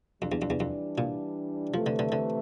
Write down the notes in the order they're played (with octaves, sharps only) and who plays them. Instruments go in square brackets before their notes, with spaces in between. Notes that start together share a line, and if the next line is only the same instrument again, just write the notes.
[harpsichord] F2 [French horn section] E3 G3 D4
[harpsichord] E2
F2
E2
F2
A#2
[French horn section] C3 E3 A3 [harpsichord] F3
[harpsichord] D3
D3
D3